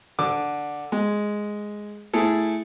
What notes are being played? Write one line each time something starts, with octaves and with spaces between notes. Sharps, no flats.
D3 D6
G#3
A3 E4 G#4 A4